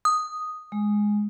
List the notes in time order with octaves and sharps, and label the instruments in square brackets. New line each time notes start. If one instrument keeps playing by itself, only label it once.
[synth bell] D#6
[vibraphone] G#3